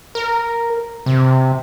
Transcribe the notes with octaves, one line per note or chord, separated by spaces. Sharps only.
A#4
C3